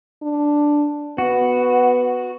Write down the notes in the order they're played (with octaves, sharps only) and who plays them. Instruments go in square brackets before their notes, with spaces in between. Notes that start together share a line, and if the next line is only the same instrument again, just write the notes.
[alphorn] D4
[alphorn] B3 [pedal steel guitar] F#4